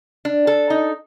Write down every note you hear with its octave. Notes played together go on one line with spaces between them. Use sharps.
D4
A4
D#4